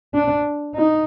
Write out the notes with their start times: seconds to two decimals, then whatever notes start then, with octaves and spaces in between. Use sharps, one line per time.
0.14 D4
0.76 D#4